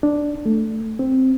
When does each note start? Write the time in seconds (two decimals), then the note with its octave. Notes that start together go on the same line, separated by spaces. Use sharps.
0.03 D4
0.46 A3
0.99 C4